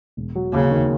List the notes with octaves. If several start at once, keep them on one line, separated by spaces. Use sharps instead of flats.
E1
F#3
D#2 C#3
D#3